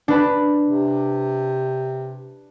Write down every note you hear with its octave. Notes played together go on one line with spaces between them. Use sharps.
D4 B4
C3